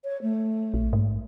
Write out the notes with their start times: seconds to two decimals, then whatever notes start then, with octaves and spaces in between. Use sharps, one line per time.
0.04 C#5
0.22 A3
0.74 A#1
0.93 G#2